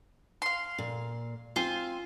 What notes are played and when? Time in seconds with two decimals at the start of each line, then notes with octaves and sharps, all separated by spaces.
0.42 F5 C6
0.78 A#2
1.56 C4 F4 C5 G#5